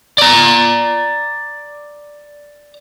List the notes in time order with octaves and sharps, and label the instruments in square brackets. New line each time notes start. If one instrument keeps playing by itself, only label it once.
[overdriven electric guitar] D5 A#5